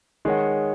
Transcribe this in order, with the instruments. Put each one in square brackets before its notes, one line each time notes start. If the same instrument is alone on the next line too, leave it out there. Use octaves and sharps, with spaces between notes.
[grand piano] D#3 G#3 [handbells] G#4 C#5 F#5